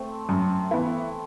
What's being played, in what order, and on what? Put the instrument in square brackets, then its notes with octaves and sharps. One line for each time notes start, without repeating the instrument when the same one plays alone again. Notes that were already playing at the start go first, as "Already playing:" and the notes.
Already playing: [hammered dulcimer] A3 C4
[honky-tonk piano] F#2
E3 B3 E4